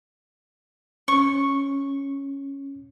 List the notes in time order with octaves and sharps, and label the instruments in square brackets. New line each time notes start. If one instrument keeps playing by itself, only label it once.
[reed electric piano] C#4 [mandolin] C#6